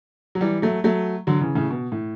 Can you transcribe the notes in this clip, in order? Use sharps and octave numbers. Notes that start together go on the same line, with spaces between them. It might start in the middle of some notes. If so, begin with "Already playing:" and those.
F#3
E3 G3
F#3 A3
F#3 A3
D3 F#3
C#3 E3
A2 C#3
B2
A2